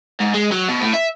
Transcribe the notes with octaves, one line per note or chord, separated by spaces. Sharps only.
G#2
G#3
F#3
B2
A2
E5